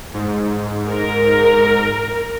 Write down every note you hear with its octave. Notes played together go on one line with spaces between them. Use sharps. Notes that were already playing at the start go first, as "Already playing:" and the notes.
G#2
A#4